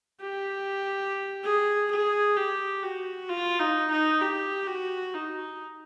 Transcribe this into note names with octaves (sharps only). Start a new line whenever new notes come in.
G4
G#4
G#4
G4
F#4
F4
D#4
D#4
G4
F#4
D#4